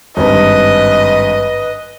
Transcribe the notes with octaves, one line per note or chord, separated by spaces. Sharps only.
G#1 G2 B4 D#5